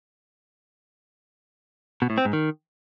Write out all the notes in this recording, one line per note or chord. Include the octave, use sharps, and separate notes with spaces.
B2
A2
C4
G#2
D#3